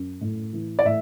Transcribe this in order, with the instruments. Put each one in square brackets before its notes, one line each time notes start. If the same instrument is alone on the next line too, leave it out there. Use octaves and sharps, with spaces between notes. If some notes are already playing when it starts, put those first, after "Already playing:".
Already playing: [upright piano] F#2
A2
E3
D5
A2 E5